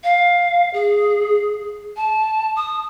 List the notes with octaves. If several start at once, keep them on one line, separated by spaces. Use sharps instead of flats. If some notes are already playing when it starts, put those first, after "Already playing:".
F5
G#4
A5
D#6